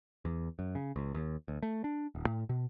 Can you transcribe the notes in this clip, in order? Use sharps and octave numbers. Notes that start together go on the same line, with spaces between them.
E2
F#2
C#3
C#2
D#2
D2
A3
D4
D#1
A2
B2